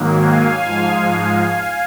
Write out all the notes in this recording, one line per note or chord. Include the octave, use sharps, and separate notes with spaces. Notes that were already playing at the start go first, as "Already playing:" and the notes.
Already playing: G#2 D#3 F#3 A#3
F5 G#5
G#2 F3 G#3